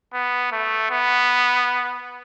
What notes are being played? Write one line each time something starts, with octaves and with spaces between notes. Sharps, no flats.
B3
A3
B3